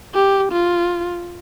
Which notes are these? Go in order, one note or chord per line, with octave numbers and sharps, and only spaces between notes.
G4
F4